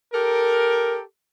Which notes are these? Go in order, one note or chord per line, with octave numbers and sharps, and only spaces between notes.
G4 A4 A#4